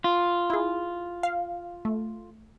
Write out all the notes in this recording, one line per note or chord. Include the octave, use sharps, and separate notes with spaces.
F4
E4 G#4
F5
A3